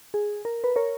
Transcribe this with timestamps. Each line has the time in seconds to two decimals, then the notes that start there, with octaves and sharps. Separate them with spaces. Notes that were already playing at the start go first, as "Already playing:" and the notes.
0.14 G#4
0.45 A#4
0.64 B4
0.76 A#4 C#5